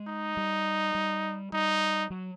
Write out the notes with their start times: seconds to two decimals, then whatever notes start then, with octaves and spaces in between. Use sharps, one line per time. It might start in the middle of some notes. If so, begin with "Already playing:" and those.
Already playing: G#3
0.08 D#4
0.37 G3
0.95 G3
1.52 G3 D#4
2.10 F#3